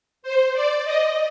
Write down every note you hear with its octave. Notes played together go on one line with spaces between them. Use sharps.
C5
D5
D#5